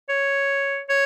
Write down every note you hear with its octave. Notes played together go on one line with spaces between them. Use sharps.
C#5
C#5